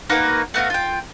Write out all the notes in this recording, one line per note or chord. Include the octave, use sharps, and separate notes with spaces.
A#3 D#4 F#4 B4
A3 B3 F#4 F5
F4 G5